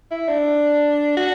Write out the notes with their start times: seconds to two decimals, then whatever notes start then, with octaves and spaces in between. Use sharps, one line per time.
0.11 E4
0.28 D4
1.17 F#4